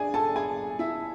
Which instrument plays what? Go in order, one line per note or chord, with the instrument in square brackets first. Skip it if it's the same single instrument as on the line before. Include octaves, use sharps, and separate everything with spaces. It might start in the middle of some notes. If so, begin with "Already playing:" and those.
Already playing: [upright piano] D4 G#4 D5 G#5
A4 A5
G#4 G#5
E4 E5